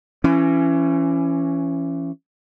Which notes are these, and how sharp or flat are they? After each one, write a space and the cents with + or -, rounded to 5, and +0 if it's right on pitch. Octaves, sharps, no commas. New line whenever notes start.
E3 +30 C#4 +0